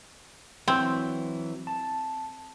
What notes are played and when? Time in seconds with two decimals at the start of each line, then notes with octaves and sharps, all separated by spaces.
0.68 E3 F#3 C4 G6
1.67 A5